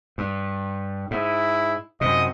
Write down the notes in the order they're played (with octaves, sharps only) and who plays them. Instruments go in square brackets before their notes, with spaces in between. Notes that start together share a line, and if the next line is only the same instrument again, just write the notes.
[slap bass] G2
[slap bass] G#2 [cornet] E4
[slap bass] F#2 C3 [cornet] D#5